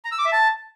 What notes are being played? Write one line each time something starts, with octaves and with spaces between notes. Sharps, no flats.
A#5
E6
D6
E5
A5